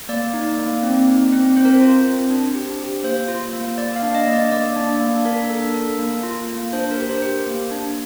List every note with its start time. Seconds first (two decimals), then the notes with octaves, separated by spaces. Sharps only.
0.09 A#3 D5
0.33 D#4
0.58 A#3
0.83 C4
1.07 D#4
1.32 C4
1.56 C4 C5
1.65 A#4
1.73 C5
1.81 F4
2.05 C4
2.30 D4
2.55 G4
2.80 G4
3.04 A#3 C5
3.28 F4
3.53 A#3
3.78 A#3 D5
3.96 F5
4.02 D4
4.15 D#5
4.27 A#3
4.33 D5
4.51 A#3 D5
4.76 D4
5.00 A#3
5.25 D4 A#4
5.50 A4
5.74 A4
5.99 A#3
6.23 F4
6.48 A#3
6.73 D4 C5
6.91 A#4
6.97 G4
7.10 C5
7.22 G4
7.46 A#3
7.71 D4